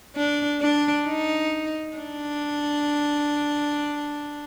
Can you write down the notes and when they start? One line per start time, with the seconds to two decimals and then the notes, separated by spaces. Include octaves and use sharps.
0.16 D4
0.61 D4
1.07 D#4
1.97 D4